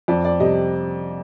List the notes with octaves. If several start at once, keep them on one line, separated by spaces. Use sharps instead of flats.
F2 D5
D5
C3 G3 D#5